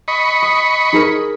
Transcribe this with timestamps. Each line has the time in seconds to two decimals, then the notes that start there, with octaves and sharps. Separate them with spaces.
0.08 D#5 B5 C#6
0.43 D#6
0.93 D#4 G#4 A#4